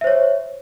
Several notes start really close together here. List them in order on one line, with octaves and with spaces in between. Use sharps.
E5 C5 C#5